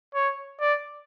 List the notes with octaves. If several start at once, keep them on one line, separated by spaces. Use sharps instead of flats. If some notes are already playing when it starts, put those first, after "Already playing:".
C#5
D5